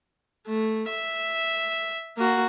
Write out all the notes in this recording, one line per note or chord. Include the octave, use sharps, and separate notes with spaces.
A3
E5
A#3 F#4